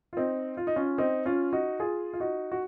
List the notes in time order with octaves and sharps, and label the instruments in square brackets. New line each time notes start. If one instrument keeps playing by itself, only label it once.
[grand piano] F4
C4 D#4
F4
D#4
C#4 F4
C4 D#4
C#4 F4
D#4 F#4
F4 G#4
F4
D#4 F#4
F#4